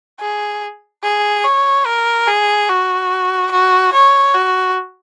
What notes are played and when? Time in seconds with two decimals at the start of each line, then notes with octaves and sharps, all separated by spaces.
0.20 G#4
1.03 G#4
1.44 C#5
1.86 A#4
2.27 G#4
2.69 F#4
3.51 F#4
3.93 C#5
4.34 F#4